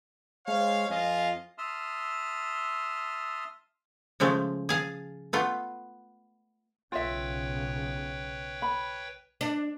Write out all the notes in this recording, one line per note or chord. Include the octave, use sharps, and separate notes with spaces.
G#3 C5 C#5 F5
F2 F4 D#5 F5 G#5
E5 A5 C6 D#6 F6
C#3 F3 G#3 A3
G#4 F5 A5
A3 B3 F4
B1 C#3 F4 B4 C#5 E5 G5
B5
D4